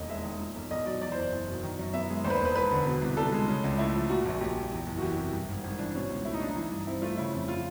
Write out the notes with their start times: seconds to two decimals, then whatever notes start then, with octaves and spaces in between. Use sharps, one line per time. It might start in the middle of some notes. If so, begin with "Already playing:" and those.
Already playing: E1 D#2 D#5
0.09 G#3 E5
0.24 D#3
0.40 A#2
0.55 B1
0.71 B1 D#5
0.86 F#3 D5
1.01 E2 D5
1.12 F#1 C5
1.22 D5
1.32 F#1
1.48 B2
1.63 D#3
1.79 F#2
1.93 B3 E5
2.09 G#3
2.24 D#2 C5
2.30 B4
2.35 E1 C5
2.45 B4
2.55 E1 B4
2.71 D3
2.86 B2
3.02 C2
3.17 C2 A4
3.32 G#3
3.48 C#3
3.64 C#2
3.78 A3 E4
3.94 F3
4.09 A#2 F#4
4.25 A#1
4.40 A#1 G4
4.56 G3
4.72 E2
4.86 F#1
4.98 F#4
5.02 E3 G4
5.17 C3
5.33 G2
5.48 G#1
5.64 G#1
5.79 E3 D4
5.94 B2 C#4
6.10 C#2
6.25 A3 E4
6.34 D#4
6.40 F#3 D4
6.49 D#4
6.56 E3
6.72 G2
6.87 C4 E4
7.02 A3 F4
7.17 C#3 E4
7.33 F2
7.48 F4